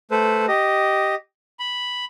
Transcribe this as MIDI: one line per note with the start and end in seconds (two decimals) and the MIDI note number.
0.11 0.46 57
0.11 0.46 69
0.11 0.46 71
0.11 0.46 72
0.48 1.15 67
0.48 1.15 75
1.59 2.05 83